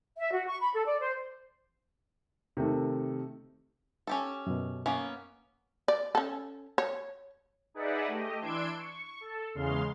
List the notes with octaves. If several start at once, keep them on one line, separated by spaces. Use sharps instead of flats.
E5
F#4
C#6
B5
A4
D5
C5
C3 D#3 A3
C#4 G4 A4
F#2 B2
A#3 B3 C#4
D5
C#4 A4
C#5
D#4 G#4 B4 D5 E5 F#5
A3 G4 D#5
E3 D4 C6 E6 G#6 D7
C#6
A4
E2 C#3 G#3 F5 C6